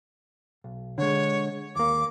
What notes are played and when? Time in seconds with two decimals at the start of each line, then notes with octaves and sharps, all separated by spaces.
0.64 B1
0.98 D3 G#3 C#5
1.76 D#2 A#3 D6